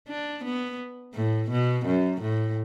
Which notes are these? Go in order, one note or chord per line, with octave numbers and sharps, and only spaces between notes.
D4
B3
A2
B2
F#2
A2